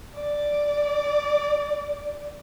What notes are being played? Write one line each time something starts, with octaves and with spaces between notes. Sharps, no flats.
D5